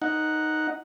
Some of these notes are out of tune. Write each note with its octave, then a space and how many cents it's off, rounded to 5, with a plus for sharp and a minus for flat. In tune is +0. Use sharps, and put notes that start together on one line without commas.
D#4 +0 F#5 +0